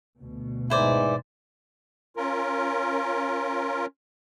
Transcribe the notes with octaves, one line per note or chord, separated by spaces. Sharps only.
D2 B2
G#2 E3 E4 C5 D5
C#4 F4 A#4